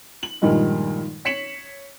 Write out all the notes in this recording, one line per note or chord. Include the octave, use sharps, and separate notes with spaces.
F#7
G2 A#2 D#3 F3 G3 G#3
C#5 B6 C#7 E7 F#7